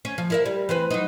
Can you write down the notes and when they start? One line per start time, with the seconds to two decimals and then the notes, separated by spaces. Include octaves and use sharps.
0.05 C#4
0.18 F3
0.30 E4 A#4 E5
0.46 G3
0.69 E3 C4 B4
0.90 F#3 D#4